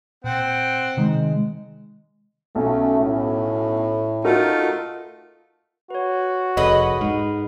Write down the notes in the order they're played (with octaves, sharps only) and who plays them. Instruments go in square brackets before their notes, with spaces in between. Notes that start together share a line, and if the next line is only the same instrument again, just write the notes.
[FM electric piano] A#2 [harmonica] C4 F#5 G5
[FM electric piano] C3 D#3 [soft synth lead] G#3
[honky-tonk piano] B1 C#4 [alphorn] A3
[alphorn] A2
[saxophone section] A3 D#4 F4 [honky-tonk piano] F#4 A#4 F6
[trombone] F#4 [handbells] B4 C#5
[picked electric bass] F1 [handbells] G#4 A4 C#5 [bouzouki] B4 D#5
[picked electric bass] G#2 [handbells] F6